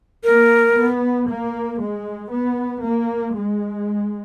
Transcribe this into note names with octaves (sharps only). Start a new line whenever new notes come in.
A#3 A#4
B3
A#3
G#3
B3
A#3
G#3